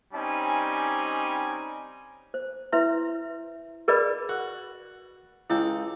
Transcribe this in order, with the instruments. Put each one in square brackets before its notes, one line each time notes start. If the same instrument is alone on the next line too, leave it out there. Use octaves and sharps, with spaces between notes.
[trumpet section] G3 C4 C#4 D#4 G#5
[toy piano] C5
E4 B4 C#5 E5 C6
G#4 A#4 B4 D5 D#5 B5
[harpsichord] F#4
[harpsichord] C#2 A4 G5 [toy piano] E4